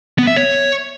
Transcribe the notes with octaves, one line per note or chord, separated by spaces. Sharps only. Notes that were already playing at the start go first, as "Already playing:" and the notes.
B3
E5
C#5